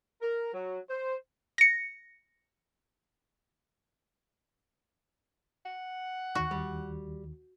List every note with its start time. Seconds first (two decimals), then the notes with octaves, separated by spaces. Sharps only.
0.22 A#4
0.54 F#3
0.90 C5
1.58 A#6 C#7
5.66 F#5
6.35 D#2 D#3 F#4
6.51 G3